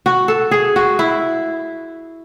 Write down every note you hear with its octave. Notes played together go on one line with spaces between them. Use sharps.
F#4
A4
G#4
F#4
E4